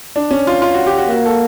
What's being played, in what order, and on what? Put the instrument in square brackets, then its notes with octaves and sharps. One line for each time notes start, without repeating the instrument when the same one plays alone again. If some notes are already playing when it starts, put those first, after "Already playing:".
[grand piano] D4
C#4
F4
F4
F#4
G4
F#4
[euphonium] A#3 [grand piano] F#4
[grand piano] A4